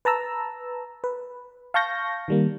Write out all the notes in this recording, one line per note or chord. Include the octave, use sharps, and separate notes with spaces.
B4 A5 A#5 E6
B4
F5 A5 C#6 G6 A#6
D#3 G3 A#3